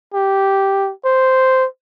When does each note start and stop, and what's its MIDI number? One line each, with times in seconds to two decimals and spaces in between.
0.14 0.92 67
1.05 1.66 72